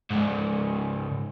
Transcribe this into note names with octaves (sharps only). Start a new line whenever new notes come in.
C#2 G#2